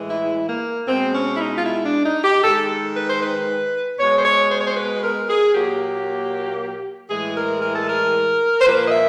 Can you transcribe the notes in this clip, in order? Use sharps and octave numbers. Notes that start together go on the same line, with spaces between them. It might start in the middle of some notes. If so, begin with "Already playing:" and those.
Already playing: A2 E3 G#3
E4
A#3
B2 G#3 C4
C#4
E4
D#4
F4
E4
D4
D#4
G4
D#3 G#3 A4
B4
C5
B4
B2 G#3 C#5
C5
C#5
C5
C#5
C5
B4
A#4
G#4
A#2 F#3 A#3 G4
A2 E3 G#3 G#4
A#4
A#4
A4
A#4
C5
A#2 F3 A#3 B4
D#5
E5